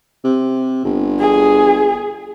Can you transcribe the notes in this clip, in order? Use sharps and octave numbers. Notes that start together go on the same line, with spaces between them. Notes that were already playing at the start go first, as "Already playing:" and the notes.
C3
G1
G#4